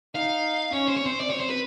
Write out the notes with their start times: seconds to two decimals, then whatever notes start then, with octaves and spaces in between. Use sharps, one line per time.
0.15 D#4 F5
0.73 C#4 C#5
0.88 C5
0.97 C#5
1.03 C4 C5
1.21 D5
1.30 C4 C#5
1.40 C5
1.50 B4